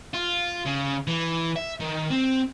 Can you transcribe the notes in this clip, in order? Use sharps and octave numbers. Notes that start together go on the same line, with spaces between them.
F4
C#3
E3
E5
D#3
C4